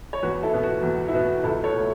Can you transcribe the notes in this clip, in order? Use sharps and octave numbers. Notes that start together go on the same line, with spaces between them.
C#5
E2 F#4 B4
E4 A4
B2 B3
F#4
E2
E4
B2 B3 F#4
C#2 E4 A4
A4 C#5
B2 A3